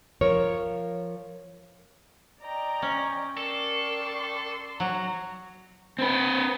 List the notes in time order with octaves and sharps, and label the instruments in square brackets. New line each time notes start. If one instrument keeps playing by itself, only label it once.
[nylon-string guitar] F3 A#4 C#5
[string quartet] D5 D#5 G5 [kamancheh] A#5
[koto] C#4
[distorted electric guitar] A4 [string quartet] A#4 G5 C#6 [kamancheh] D5 C6
[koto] F#3 [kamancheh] A#5
[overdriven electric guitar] C4 B4